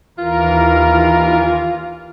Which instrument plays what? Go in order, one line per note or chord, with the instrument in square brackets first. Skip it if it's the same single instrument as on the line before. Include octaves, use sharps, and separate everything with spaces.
[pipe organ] D#2 E3 A#4 [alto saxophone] F4